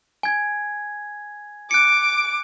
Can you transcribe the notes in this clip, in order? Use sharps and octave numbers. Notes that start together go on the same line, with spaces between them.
G#5 G#6
D6 F#6 C#7 D7